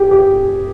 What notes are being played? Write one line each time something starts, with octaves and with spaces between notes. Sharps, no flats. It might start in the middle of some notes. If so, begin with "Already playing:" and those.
Already playing: G4 G#4
G4